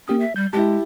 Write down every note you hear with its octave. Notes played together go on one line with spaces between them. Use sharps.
A#3 C#4 G4 D#6
E5
G3 G6
G#3 E4 G4 A5